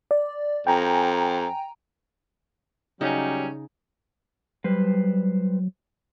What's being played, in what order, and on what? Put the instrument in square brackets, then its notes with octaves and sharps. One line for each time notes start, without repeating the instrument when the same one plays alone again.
[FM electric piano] D5
[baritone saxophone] F2 [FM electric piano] G5 G#5 A#5
[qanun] C#3 D#4 [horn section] F#3 G3 C#4
[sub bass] F#3 [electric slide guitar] G3 B4 C5